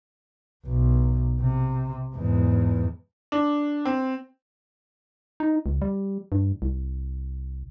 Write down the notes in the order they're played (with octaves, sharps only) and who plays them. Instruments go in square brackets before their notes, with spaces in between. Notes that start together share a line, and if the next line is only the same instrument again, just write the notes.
[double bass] B1
C3
E2 G#2
[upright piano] D4
C4
[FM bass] D#4
C#2
G3
G2
C2